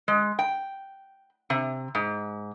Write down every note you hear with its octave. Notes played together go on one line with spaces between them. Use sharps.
G#3
G5
C3
G#2